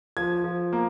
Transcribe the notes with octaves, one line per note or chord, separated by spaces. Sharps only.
F3 G#6
F3
A#3